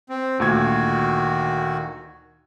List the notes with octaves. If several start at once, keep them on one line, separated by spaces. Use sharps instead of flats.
C4
D2 A#2 D#3 F#4 G#6